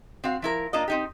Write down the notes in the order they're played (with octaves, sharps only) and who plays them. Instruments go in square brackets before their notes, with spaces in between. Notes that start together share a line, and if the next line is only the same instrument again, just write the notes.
[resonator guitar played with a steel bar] C4 F#4 F5
F3 E4 A#4
A#3 D4 F4 D#5
C4 D#4 G4